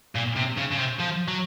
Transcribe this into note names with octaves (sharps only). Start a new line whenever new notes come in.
A#2
C3
C#3
C#3
C3
F3
F#3